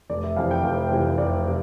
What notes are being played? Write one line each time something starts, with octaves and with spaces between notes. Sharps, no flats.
F1 D5
E5
F2 C3 E3 F5
G5
F1 F5
F2 C3 E3
F1 D5
C3